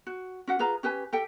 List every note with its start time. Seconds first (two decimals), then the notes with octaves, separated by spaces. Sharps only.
0.07 F#4
0.47 C#4 F#4 F#5
0.59 F4 G#4 B4 A#5
0.83 C#4 G4 B4 G#5
1.13 G4 A4 G5